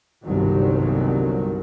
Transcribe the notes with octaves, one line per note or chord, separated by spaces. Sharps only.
G1 C2 G2 D#3 F#3